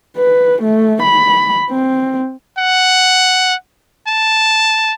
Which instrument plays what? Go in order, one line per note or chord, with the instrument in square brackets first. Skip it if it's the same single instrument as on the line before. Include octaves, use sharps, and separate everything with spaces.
[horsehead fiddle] B4
A3
B5
C4
[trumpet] F#5
A5